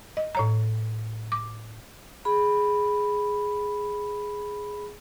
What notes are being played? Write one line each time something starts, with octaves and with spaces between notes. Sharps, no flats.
D#5
A2 C#5 A#5
D6
G#4 B5